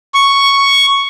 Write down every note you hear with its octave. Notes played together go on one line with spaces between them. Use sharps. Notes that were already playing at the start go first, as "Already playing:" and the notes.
C#6